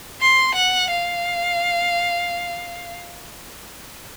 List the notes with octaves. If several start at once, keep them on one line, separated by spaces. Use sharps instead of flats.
C6
F#5
F5